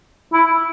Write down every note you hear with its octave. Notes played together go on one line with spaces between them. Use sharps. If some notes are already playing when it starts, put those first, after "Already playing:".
E4